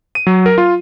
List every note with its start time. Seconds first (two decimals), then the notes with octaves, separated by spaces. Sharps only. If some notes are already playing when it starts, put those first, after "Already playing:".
0.15 D#7
0.27 F#3
0.46 A#4
0.58 F4